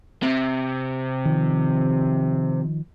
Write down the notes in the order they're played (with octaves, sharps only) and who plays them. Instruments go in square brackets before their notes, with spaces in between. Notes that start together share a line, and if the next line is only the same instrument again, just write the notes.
[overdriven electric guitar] C3
[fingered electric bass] D#3 F3